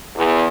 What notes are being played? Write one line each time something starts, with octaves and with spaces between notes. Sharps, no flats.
E2